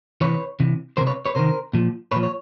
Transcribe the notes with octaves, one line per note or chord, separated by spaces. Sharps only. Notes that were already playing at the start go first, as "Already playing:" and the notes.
C3 E3 B4 C#5
C3 E3
D#3 A#4 C5
C3
B4 C#5
B4 C#5
C3 D#3 A#4 C5
A#2 F3
A#2 F3 B4 C#5
C#5